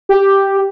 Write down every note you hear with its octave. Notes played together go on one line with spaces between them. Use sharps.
G4